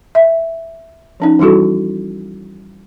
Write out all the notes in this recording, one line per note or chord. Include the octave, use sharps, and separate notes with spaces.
E5
F3 C#4 D#4
E3 G3 E4 F#4 A4